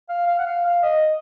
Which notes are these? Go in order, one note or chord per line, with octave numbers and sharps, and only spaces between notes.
F5
F5
F#5
F5
F5
D#5